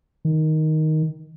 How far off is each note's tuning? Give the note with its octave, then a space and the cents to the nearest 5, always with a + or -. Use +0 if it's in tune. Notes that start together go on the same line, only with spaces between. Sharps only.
D#3 +5